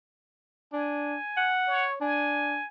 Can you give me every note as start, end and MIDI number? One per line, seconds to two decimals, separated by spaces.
0.73 1.16 62
0.73 1.53 80
1.37 1.85 78
1.67 1.99 73
2.01 2.58 62
2.01 2.67 80